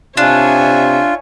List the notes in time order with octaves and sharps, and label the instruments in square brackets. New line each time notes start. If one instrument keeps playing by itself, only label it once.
[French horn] C3 [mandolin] D4 [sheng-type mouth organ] F4 [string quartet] C#5 E5 G#5